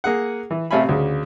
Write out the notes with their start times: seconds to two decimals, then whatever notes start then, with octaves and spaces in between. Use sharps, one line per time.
0.04 A#3 G#4 F#5
0.51 E3
0.71 A1 C3 A3 F5 G#5 B5
0.89 D2 C#3